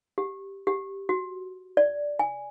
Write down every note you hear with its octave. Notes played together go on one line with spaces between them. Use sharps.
G4
G4
F#4
D5
G#5